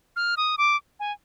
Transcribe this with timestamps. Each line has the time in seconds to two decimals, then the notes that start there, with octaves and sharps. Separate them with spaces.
0.16 F6
0.37 D#6
0.58 D6
1.00 G#5